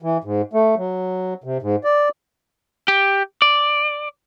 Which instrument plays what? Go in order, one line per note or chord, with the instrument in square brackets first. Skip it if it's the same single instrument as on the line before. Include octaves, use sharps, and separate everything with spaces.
[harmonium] E3
G#2
A3
F#3
C3
G#2
D5
[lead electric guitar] G4
D5